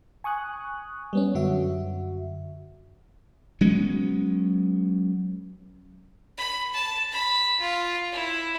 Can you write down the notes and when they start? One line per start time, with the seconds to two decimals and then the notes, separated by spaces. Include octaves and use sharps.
0.24 G#5 C#6 D#6 F#6
1.13 G3 B3 C#4
1.34 F#2 D3 F#4 E5
3.61 F#3 G#3 B3 C#4
6.38 B5
6.74 A5
7.12 B5
7.60 F4
8.12 E4